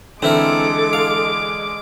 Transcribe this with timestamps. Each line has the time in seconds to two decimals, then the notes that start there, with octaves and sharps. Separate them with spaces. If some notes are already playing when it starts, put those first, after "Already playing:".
0.22 D3 E3 G#3 C4 E4 A4 A#4 D6
0.93 F5